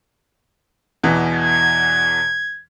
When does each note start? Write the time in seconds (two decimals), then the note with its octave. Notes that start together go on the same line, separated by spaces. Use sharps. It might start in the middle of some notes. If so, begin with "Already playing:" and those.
1.03 E2 B2 E3
1.33 G#6